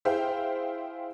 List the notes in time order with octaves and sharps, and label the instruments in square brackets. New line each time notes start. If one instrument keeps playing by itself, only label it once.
[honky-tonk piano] E4 G#4 C5 E5 F5 G5